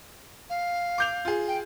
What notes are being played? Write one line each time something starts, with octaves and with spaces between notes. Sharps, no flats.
F5
D6 G6 F7
F4 G#4
G5